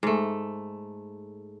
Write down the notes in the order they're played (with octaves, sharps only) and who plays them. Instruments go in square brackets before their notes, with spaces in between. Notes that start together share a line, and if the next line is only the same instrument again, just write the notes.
[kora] G#2 A3